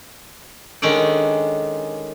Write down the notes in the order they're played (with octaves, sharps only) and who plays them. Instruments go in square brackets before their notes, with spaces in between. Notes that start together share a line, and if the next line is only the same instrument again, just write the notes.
[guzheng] D#3 G#3 C#4 D4 A4 D5